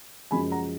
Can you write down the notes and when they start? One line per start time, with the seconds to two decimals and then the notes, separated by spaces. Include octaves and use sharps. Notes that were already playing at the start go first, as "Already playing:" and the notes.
0.31 F#1 F#2 F3 G#3 G#5 B5
0.51 F#5 A#5